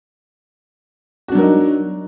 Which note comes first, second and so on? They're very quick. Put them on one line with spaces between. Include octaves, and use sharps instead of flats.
F#4 D4 F#3 A#4 D#4